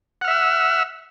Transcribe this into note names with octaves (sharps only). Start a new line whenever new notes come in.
E5 F#5 E6 F6